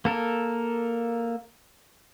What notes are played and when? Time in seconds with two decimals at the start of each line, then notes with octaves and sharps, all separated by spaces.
0.05 A#3 A4 A#4